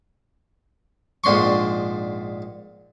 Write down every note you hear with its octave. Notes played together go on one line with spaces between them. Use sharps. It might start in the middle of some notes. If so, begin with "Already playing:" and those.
A#1 G#2 D4 C6 C#6